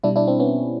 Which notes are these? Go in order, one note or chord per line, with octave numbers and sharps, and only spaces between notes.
B2 G3 D4 E4
D4 E4
C4 D4
B3 C#4